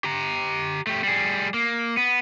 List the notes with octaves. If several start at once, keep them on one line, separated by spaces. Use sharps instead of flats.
G4 A#5
A3 G4
G3 G#4
A#3
B3